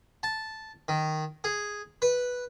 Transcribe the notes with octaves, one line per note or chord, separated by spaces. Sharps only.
A5
D#3
G#4
B4